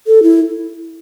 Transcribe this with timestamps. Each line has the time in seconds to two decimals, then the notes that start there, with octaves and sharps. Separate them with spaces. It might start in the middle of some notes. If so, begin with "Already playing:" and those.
0.07 A4
0.23 E4